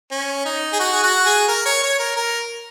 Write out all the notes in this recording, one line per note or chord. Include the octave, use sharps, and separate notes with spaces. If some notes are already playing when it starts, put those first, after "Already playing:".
C#4
D#4
G#4
F#4
G#4
F#4
G#4
A#4
C#5
C#5
A#4
A#4